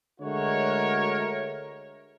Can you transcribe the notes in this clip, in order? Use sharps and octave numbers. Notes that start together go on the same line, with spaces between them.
D3 G#3 A3 F#4 A#4 C#5